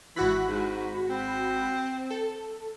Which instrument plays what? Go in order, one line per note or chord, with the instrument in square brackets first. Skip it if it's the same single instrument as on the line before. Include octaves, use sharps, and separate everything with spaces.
[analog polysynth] G#1 F#4 B5 [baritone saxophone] E3
[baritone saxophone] G#2
C4
[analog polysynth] A4